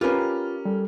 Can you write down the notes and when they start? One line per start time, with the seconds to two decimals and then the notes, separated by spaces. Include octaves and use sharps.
0.01 C#4 F4 G4 A#4 B4 F6
0.65 G3 A4